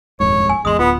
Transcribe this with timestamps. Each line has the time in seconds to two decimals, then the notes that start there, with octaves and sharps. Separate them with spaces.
0.20 D#1 F2 G#2 C#5
0.49 G#5
0.65 G#1 E2 G#3 C6 D#6
0.79 D1 B3 F4